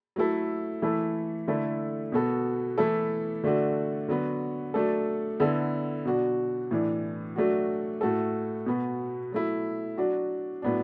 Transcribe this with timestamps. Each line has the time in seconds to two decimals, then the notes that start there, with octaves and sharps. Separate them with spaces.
0.16 F#3 A3 E4 A4
0.82 E3 A3 E4 A4
1.48 D3 A3 E4 A4
2.12 B2 B3 F#4 A4
2.78 E3 A3 E4 A4
3.44 D3 A3 D4 F#4
4.08 D3 F#3 B3 F#4
4.74 F#3 A3 D4 A4
5.40 D3 B3 E4 A4
6.05 B2 F#3 D4 F#4
6.71 A2 E3 D4
7.36 F#3 A3 D4 F#4
8.01 A2 A3 F#4 A4
8.66 B2 B3 F#4
9.32 F#3 A3 E4
9.97 F#3 D4 F#4
10.62 A2 F#3 B3 D4